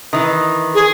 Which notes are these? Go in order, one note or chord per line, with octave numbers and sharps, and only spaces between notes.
D#3 E3
G#4